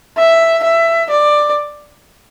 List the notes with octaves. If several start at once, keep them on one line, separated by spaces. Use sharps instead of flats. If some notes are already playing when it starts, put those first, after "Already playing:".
E5
E5
D5